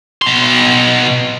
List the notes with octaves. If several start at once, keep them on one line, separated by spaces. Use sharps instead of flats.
B2 C6